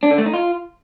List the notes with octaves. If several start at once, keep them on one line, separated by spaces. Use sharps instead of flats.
D4
D3
A3
D#4
F4